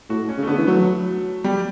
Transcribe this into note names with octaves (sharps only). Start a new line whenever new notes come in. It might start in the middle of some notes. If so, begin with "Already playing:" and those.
A2 F#4
C#4
C#3
A3
D3 B3
E3
F#3 A3
G3